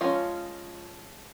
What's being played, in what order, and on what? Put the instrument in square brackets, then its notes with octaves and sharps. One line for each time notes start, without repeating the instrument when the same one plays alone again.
[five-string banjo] F3 G#3 C#4 F4